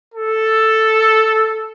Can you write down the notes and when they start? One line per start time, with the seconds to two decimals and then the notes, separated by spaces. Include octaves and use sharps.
0.14 A4